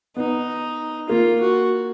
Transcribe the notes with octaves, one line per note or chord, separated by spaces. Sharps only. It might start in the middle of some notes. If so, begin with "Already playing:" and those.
B3 D#4
A#3 F4
F#4